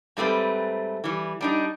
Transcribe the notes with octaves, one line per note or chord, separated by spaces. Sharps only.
G#2 G3 A3 C4 B4
E3 G3
G3 D4 D#4